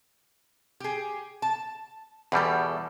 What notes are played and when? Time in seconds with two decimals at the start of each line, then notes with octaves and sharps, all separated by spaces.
0.80 G4 G#4
1.42 A5
2.32 E2 B2 E3 G3 A4